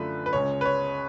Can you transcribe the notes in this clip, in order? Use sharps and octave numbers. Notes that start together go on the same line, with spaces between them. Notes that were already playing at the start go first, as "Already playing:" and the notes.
Already playing: F#2 D3 F3 A3 B4
B4
C#2 C#3 G#3 C#5
B4
C#5